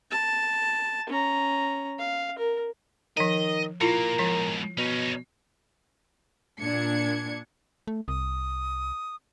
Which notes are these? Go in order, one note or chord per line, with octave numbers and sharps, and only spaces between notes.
A5
C#4 A#5
F5
A#4
D#3 F3 D#5 A#5
A#2 A#3 E4 F4 A#4
G#2 B2 F3
B2 C#4 D#4
A#2 D4 G#6 C#7
A3
C2 D#6